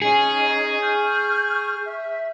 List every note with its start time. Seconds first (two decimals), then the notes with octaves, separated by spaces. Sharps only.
0.02 C#4 D#4 G#4
0.81 C#6 F6 G6
1.85 E5